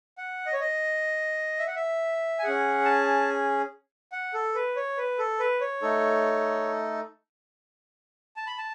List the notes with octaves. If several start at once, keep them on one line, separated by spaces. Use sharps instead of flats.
F#5
D#5
C#5
D#5
E5
F#5
E5
G#5
C#4 G#4 F#5
A5
F#5
A4
B4
C#5
B4
A4
B4
C#5
A3 D#4 A4
A5
B5
A5